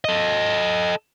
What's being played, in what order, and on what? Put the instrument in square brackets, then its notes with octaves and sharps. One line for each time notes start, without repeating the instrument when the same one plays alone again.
[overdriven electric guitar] A4 D#5